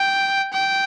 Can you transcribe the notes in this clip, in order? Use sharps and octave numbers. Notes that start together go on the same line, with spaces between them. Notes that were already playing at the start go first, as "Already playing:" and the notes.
Already playing: G5
G5